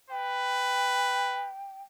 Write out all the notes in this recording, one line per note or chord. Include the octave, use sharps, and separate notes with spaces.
B4 G5